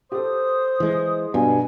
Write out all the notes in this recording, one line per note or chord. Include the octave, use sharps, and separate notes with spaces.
G4 A4 C5 D#6
E3 G#3
B1 G2 B2 G#5